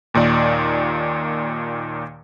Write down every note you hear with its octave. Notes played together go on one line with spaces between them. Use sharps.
D#2 A#2 D#3 D5